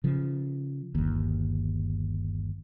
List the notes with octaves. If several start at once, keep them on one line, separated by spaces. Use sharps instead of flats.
C#3 F3
G1 D#2